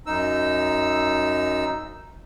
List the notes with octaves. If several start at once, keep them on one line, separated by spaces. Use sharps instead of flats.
F#2 D#4 E6